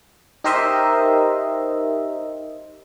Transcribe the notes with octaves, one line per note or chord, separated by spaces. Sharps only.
D#4 G4 A#4 C5 D#5 E5